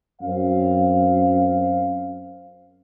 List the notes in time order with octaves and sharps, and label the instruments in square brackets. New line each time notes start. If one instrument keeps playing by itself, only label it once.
[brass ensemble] F#2 C4 F5